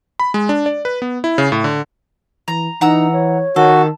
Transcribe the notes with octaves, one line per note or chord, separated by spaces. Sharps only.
B5
G#3
D4
D5
B4
B3
E4
C#3
A2
D3
E3 A#5
E3 D#4 F#5 A#5 E6
C#5
D#3 F#4 A4